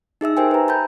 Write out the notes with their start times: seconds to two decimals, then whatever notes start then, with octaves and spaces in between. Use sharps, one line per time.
0.21 D#4 G#4 E5 E6
0.37 G4 A#4 C5 G5 G#5
0.51 B4 A#5
0.68 A5 B5 G6